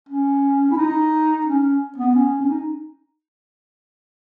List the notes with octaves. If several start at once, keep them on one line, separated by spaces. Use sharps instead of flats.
C#4
E4
D#4
C#4
B3
C#4
C#4
D#4